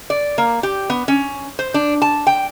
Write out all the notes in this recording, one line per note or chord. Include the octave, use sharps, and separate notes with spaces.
D5
A#3
G4
B3
C#4
C5
D4
A5
G5